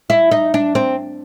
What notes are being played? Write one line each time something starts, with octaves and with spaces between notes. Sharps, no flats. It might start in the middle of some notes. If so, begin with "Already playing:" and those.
E4
D#4
D4
C4